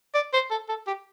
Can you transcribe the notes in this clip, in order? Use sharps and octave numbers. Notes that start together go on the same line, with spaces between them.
D5
C5
A4
A4
G4